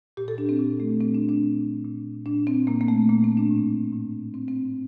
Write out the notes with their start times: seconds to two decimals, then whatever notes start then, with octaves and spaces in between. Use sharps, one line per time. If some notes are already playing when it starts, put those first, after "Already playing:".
0.17 A#2 G4
0.28 A4
0.38 D4
0.49 C4
0.59 A#2
0.80 A3
1.01 A#2 C4
1.14 D4
1.29 D4
1.43 A#2
1.85 A#2
2.26 A#2 D4
2.47 C4
2.67 A#2 A#3
2.81 A#3
2.88 A3
3.09 A#2 A#3
3.24 C4
3.37 D4
3.51 A2
3.93 A2
4.34 A2 C4
4.48 C4